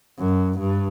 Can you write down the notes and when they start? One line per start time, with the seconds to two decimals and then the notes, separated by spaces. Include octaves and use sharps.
0.19 F#2
0.59 G2